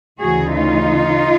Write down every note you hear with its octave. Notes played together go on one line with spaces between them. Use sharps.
D2 C#3 E3 F#4 G#4
D#4 F4